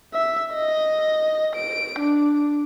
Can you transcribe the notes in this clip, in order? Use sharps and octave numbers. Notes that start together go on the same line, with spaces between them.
E5
D#5
D7
D4